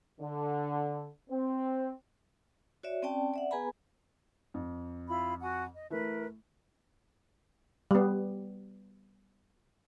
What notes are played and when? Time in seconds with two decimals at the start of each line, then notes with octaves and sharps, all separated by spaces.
0.20 D3
1.30 C4
2.83 F#4 C#5 D5 E5
3.02 C4 C#4 D5 G5 A5
3.34 D5 E5 F#5
3.51 B3 G#4 B4 G#5 A#5 B5
4.54 F2
5.07 E4 F4 B5
5.40 F#4 F#5 G#5
5.74 D#5
5.90 E3 A3 A#4 B4
7.91 G3 B3